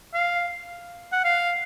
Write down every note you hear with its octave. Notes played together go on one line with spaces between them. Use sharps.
F5
F#5
F5